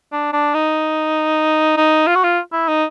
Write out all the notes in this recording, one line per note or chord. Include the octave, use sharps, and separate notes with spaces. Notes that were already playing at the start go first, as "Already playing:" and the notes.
D4
D4
D#4
D#4
F4
F#4
F4
E4
D#4